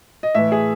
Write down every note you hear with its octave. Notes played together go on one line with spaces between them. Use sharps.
D#5
A2 E3 E5
G#4